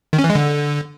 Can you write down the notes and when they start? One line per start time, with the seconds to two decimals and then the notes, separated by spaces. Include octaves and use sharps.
0.13 D#3
0.19 C#4
0.24 E3
0.30 G#3
0.35 D3